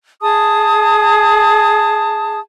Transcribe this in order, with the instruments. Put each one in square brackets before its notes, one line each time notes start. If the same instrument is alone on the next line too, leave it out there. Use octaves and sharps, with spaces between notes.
[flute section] G#4 A5 D#6